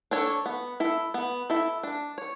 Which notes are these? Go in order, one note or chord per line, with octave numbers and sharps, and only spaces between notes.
D4 A4 C#5
B3
E4 A4
B3
E4 A4
D4
C#5